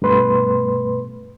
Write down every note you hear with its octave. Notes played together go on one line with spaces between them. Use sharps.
G2 B2 A3 B4 C6